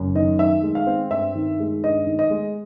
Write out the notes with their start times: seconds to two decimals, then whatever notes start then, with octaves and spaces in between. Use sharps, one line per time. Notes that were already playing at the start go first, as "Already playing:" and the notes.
Already playing: F#1 F#2
0.15 D#3 D#5
0.39 D#3 E5
0.63 G#3
0.75 F5
0.87 C4
1.11 G2 E5
1.35 D#3
1.60 G#3
1.84 G2 D#5
2.07 D#3
2.19 D#5
2.30 G#3